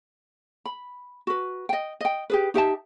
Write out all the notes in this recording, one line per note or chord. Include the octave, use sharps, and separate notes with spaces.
B5
F#4 B4
D#5 G5
D#5 G5
G4 G#4 B4
D#4 G4 E5 A5